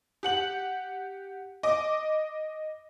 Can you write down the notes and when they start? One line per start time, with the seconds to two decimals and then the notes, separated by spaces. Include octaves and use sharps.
0.23 G4 F#5 F#7
1.63 D#5 D6